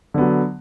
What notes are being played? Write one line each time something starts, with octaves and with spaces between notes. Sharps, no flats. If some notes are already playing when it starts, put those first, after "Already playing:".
D3 F#3 B3